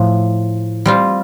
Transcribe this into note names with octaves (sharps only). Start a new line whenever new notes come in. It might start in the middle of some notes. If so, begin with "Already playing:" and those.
Already playing: A2 F3
G3 C4 F4